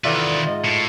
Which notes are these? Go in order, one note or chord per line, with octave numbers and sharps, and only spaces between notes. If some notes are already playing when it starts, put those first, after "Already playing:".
D#3 E3 F4 A4 B4 D5 E5 F#5
G#2 D#5
A2